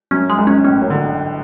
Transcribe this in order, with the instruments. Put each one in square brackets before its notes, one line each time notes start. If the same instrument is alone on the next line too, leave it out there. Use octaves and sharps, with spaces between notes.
[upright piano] F#2 [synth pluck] C#4
[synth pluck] G#3
[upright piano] G#1 G#2
[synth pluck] C#4
[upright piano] A1 A2 [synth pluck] C#4
[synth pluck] F#2
[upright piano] D3